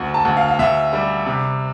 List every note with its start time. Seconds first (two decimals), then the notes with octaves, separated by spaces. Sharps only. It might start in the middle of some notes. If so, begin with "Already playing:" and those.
Already playing: D2
0.14 A5
0.25 D2
0.37 F5
0.48 F5
0.59 D2 E5
0.93 G3
1.26 C3